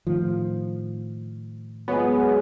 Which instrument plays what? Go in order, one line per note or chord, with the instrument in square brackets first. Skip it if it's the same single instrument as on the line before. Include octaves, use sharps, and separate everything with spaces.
[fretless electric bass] A2 D#3 F3
[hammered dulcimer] F#3 G#3 [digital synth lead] B3